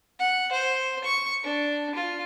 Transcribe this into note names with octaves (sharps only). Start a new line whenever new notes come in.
F#5
C5
C#6
D4
F4